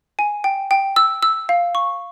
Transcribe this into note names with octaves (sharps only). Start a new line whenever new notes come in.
G#5
G5
G5
E6
E6
F5
C#6